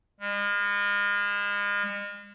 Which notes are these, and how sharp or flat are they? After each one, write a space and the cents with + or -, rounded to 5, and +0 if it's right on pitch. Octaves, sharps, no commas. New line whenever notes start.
G#3 -40